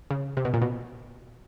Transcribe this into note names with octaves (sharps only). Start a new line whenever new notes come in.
C#3
C3
B2
A#2
B2